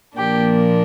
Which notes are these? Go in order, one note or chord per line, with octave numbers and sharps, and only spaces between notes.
A#2 F3 A#3 D4 G4